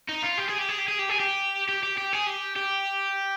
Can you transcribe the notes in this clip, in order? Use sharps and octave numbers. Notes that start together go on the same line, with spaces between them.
D#4
F4
G4
G#4
G4
G#4
G4
G#4
G4
G#4
G4
G4
G4
G4
G#4
G4
G4